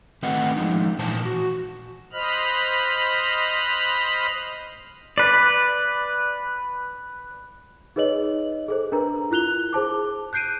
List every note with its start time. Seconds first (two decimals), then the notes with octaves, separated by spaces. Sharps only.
0.23 D#3 A3 C4 B4 D#5 F#5
0.56 F3 G#3 D4 D#4
0.99 A#2 E3 C5 G#5 A5
1.25 F#4
2.13 C5 D#5 B5 F6 F#6
5.18 B4 D5
7.96 D#4 G#4 B4 C#5 D#5 F#7
8.68 G#4 A4 C5
8.92 D4 A#4 B4 A#5
9.31 E4 F4 F#6 F7 G7
9.73 G#4 C5 A5 D6
10.33 F#6 G6 C7 D7 D#7